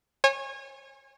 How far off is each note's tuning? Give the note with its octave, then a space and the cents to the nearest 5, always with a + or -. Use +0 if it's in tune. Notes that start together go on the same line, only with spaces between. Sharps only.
C#5 -30 G#5 -20